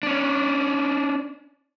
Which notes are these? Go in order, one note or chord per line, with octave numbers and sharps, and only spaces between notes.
C#4 D4